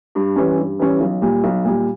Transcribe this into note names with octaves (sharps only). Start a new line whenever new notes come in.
G2
E3 G3 C#4
G2
E3 G3 C#4
B1
A#2 G3
B1
A#2 G3